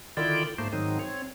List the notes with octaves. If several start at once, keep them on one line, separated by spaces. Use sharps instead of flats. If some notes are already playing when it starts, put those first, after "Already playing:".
D3 D#3 E4 F4 D5 G5
G#2 A3 A#3 C5
G#2 D#3 F#3 C4 D#4
C4 C#5